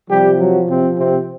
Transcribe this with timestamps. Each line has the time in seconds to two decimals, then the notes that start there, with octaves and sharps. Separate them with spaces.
0.10 C3 F3 G3 G4
0.39 F#3 F#4
0.69 C3 C4
0.98 C3 C4